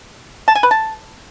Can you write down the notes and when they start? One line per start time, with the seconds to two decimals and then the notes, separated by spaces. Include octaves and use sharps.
0.48 A5
0.55 G#5
0.63 B4
0.71 A5